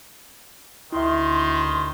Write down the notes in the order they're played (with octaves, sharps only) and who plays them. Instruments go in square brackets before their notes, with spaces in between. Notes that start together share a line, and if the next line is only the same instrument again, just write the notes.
[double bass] D2 [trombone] D#3 [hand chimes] E4 E5 [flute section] C6